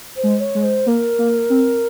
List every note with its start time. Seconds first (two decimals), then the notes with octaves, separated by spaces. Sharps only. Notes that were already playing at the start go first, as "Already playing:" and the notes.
0.16 C5
0.23 G#3
0.39 C#5
0.55 G#3
0.63 C5
0.86 A#3 A#4
1.19 A#3
1.50 C4